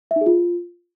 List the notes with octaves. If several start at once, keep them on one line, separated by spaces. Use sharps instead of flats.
E5
D#4
G#4
F4